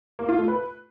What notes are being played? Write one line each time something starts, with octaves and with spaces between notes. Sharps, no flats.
A#3
F4
A3
B4